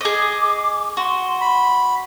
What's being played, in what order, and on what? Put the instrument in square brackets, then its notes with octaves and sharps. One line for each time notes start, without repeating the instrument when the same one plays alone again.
[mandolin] G#4 D#5 [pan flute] D6
[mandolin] F#4 [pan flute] C6
[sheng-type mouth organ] B5